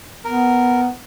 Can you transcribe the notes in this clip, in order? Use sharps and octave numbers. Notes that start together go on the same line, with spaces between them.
B3 A#4